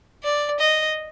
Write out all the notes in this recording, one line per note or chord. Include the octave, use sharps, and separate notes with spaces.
D5
D#5